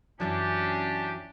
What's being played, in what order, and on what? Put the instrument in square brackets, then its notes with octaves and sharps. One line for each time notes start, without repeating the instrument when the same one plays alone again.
[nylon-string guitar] F#2 E3 F#3 [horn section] C#4 D4 G4